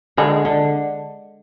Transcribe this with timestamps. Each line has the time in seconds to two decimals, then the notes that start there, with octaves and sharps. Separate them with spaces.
0.17 D3 G#3
0.45 D3